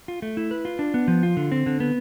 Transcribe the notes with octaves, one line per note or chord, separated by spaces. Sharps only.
F4
A3
E4
B4
F4
D4
B3
F3
F4
D3
C4
D3
B3